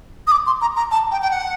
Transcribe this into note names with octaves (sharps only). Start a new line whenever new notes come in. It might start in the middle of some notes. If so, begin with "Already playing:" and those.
D#6
D6
C6
A#5
A#5
A5
G5
G5
F#5